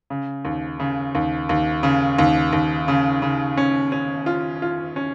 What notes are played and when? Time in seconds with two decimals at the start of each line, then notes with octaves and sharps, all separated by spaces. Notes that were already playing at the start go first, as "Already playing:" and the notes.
0.10 C#3
0.45 D#2
0.80 C#3
1.15 D#2
1.49 D#2
1.83 C#3
2.19 D#2
2.53 D#2
2.88 C#3
3.22 C#3
3.57 C#4
3.92 C#4
4.26 F4
4.62 F4
4.96 C#4